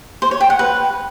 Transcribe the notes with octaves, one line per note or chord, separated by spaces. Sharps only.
C5
C#5
G5
F#5
B4